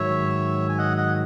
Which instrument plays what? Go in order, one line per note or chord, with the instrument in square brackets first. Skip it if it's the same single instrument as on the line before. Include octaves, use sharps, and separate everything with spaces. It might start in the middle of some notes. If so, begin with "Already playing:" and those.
Already playing: [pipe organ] G#2 D#3 F#3 [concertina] C#5 E5
[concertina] G#5
D#5 F#5
D#5 F#5